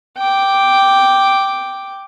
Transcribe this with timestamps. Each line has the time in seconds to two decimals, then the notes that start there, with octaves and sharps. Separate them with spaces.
0.18 G5 D6